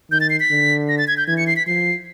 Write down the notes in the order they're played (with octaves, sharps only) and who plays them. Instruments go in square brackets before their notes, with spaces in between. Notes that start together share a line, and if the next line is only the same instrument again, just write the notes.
[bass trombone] D#3 [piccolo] G6
[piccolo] A6
C7
B6
[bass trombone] D3
[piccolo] A#6
A6
G#6
G6
[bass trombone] E3 [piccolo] G#6
[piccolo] C#7
C7
B6
[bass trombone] F3 [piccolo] C7